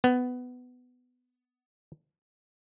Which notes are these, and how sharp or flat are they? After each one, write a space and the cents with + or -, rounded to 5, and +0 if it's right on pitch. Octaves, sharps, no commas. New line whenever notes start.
B3 +15